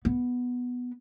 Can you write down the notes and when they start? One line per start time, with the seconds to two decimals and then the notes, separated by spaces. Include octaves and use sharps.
0.05 B3